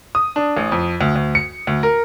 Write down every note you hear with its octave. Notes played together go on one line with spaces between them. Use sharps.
D#6
D4
A1
F2
D2
D2
C#7
D2
A#4